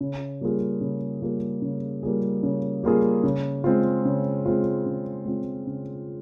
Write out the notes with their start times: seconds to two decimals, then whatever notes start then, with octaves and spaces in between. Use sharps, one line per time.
0.01 C#3
0.41 G3 A#3 F4 G#4
0.81 C#3
1.21 G3 A#3 F4 G#4
1.62 C#3
2.03 G3 A#3 F4 G#4
2.43 C#3
2.83 G3 A#3 F4 G#4
3.23 C#3
3.64 G#3 C4 F4
4.05 C#3
4.46 G#3 C4 F4
4.86 C#3
5.25 G#3 C4 F4
5.67 C#3